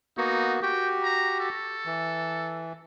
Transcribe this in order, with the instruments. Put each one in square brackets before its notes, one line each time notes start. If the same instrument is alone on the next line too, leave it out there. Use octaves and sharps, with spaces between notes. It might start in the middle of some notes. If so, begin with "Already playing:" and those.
[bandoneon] A#3 B3 F#4 [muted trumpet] D#4
[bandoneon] F#4 G4 [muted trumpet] G5
[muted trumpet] A#5
A4
[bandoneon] E3